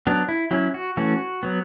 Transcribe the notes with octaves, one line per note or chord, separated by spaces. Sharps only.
F#3 B3 D4
E4
F#3 C#4 E4
F#4
E3 A3 C#4 F#4
F#3 B3